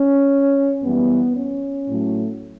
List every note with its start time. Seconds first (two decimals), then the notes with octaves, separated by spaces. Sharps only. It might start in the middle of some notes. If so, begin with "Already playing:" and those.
Already playing: C#4
0.83 F#2 E3 G3 B3
1.36 C#4
1.88 A2 F#3 A3